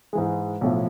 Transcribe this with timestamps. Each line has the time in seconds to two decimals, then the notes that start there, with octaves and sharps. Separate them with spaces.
0.13 G#2 E3 G#3
0.61 B1 A2 F3